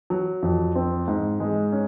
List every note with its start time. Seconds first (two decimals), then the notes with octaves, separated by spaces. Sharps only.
0.10 F#3
0.43 F2
0.75 C4
1.08 G#2
1.40 G#3
1.72 C#4